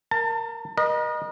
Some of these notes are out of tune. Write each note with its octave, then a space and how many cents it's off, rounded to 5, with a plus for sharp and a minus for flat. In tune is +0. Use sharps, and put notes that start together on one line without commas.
A#4 +0 A5 +35
A#4 +45 D#5 -20